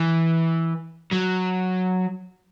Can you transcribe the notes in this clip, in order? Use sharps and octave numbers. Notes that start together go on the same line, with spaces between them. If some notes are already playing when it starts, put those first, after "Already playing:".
Already playing: E3
F#3